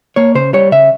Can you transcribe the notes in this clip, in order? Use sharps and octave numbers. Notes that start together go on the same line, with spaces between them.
A#3 C#5
C#3 C5
G3 C#5
C#3 E5